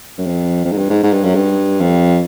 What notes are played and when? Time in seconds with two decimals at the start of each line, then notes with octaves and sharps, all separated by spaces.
0.18 F#2
0.26 F2
0.65 F2
0.72 G#2
0.77 G2
0.90 G#2
1.03 G#2
1.13 G2
1.24 F#2
1.35 G2
1.80 F2